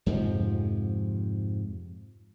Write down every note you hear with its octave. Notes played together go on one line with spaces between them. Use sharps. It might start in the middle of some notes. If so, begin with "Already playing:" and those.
F2 G#2 C3 F3